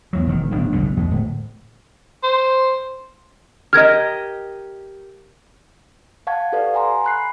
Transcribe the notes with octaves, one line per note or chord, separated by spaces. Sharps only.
E2 F#3
E1 D#3
D1 B1 D#3 D4
F#1 B1 D3
E2 G#3
D1
C5
G4 A#4 D#5 F6 G#6
F5 F#5 A5 C#6 G#6
G4 A4 B4 D5 F5
F#5 G#5 A#5 C6
B5 F#6 C7